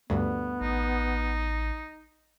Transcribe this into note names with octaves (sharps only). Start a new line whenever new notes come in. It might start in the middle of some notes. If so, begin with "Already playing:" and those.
D2 G2 B3
A1 D#4